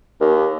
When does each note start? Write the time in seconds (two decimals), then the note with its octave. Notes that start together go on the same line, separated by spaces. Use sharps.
0.21 D#2